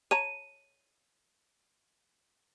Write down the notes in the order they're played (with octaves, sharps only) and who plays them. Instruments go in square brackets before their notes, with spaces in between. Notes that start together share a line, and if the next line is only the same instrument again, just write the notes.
[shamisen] C#5 A5 A#5 [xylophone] D#7